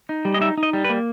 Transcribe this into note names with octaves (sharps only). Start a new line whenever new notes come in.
D#4
G3
D#5
D#4 E5
D#4
D#5
G3
B4
A#3